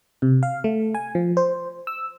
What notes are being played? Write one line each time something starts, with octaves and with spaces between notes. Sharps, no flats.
C3
F5
A3
G#5
F3
C5
E6